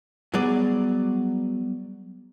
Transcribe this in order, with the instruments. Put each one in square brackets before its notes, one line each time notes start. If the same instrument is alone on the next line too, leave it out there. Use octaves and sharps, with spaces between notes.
[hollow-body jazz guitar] F#3 G#4 D5 [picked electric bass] G3 B3